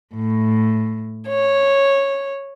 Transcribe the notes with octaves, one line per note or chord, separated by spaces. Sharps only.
A2
C#5